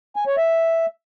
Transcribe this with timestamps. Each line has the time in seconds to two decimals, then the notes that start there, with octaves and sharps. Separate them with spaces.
0.16 G#5
0.27 C#5
0.37 E5